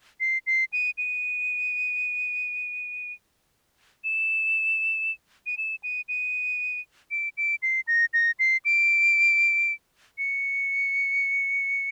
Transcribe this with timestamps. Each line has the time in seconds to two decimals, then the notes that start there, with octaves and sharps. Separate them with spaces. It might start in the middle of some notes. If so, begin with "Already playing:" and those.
0.20 C7
0.47 C7
0.73 D#7
0.98 D#7
4.04 E7
5.46 D#7
5.58 E7
5.83 D#7
6.09 D#7
7.11 D7
7.37 D7
7.63 C7
7.88 A#6
8.13 A#6
8.39 C7
8.65 D7
10.18 C#7